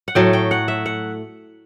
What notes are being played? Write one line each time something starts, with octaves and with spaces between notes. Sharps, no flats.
F#5
A2 F#3 A3 G5
G5
F#5
E5
F#5